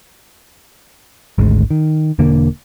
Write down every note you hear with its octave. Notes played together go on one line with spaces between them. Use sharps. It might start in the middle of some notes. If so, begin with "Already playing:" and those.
G#1 D2 G#3
D#3
E1 D3 A#3